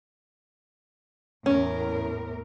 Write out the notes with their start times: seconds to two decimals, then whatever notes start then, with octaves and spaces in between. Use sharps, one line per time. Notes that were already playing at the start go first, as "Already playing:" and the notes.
1.46 E2 A2 C#4 A#4